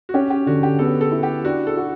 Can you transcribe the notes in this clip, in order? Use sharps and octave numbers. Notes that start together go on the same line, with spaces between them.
F#4
C#4 G4
G4
D3 F#4
G4
B3 A4
A4
E4
G4
D4 F#4
A4
F#4